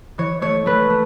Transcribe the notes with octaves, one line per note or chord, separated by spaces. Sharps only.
E3 C#5
A3 C#5
A3 B4
A3